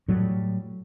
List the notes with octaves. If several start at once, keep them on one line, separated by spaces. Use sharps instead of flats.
A2 F#3 G3